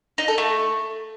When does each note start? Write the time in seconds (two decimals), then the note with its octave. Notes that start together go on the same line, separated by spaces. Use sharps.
0.18 D#4
0.28 A4
0.38 A3